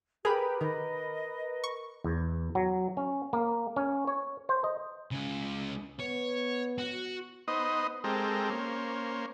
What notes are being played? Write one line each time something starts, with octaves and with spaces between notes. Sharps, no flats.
G4 G#4 A#4 B4
D#3 D#5
C#6
E2
F#3
C#4
A#3
C#4
C#5
C5
D#5
C#2 C#3
B3 C#5
F#4
B3 D#4 C5 D#5
G#3 C4 G4 A4 A#4
A#3 C#4 C5